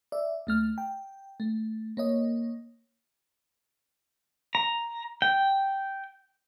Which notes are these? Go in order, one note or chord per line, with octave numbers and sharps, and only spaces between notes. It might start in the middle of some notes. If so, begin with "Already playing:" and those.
D5 E5
D2 A3 F6
G5
A3
A#3 C#5 D#5
A#5
G5